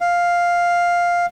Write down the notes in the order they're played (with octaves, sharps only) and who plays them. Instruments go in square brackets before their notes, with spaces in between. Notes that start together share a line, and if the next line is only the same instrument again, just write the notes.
[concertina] F5